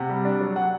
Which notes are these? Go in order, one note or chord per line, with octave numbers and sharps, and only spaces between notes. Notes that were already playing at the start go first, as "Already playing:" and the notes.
Already playing: C3 F#5
G3
D4
F#3
F#3 F#5